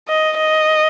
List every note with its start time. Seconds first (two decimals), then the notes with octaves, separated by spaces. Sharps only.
0.09 D#5
0.38 D#5